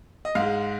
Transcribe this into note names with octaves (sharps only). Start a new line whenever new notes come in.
D#5
G#2 G#3 F5